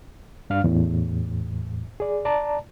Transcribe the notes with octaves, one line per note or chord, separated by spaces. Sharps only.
G2 D4 F5 F6
E2 A2
G#4 D5
D5 A5 A#5